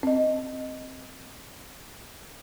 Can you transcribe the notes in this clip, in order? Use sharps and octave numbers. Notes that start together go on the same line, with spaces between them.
C4 D#5